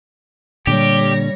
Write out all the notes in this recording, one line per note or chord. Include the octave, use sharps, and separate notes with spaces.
A#2 D3 G3 G4 C#5 A#6